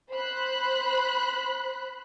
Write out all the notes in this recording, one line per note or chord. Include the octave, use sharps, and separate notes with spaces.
C5 B5 F#6